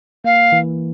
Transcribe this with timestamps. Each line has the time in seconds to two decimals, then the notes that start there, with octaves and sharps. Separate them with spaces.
0.24 A#3 F5
0.52 E3